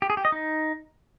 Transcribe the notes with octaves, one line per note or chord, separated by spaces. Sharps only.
G4
G#4
G4
D#5
D#4